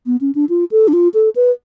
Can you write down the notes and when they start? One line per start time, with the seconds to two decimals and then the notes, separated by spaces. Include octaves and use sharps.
0.06 B3
0.21 C#4
0.35 D4
0.49 F4
0.71 A4
0.88 D4
0.93 F4
1.14 A4
1.36 B4